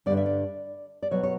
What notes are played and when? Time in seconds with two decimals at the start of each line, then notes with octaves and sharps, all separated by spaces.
0.06 G2 D3 G3 D5
0.17 E5
0.26 D5
1.03 D5
1.11 B2 F#3 C#5
1.23 C#5